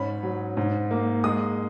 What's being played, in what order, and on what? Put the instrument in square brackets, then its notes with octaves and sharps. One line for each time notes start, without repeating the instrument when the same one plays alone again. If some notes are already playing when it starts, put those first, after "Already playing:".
Already playing: [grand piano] G#2 C#4 B5
F#3
G#2
A#3
G#3 D#6